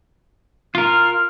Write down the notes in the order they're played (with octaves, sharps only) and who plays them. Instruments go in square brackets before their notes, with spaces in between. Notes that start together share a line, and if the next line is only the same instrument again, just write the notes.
[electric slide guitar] F4 A#4 [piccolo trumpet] F6